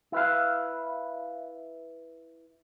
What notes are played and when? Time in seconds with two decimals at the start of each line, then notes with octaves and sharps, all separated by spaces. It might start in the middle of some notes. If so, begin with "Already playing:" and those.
0.12 E4 B4 F5